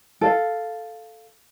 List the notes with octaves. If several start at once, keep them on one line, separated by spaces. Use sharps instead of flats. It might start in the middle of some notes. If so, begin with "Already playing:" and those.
A4 F5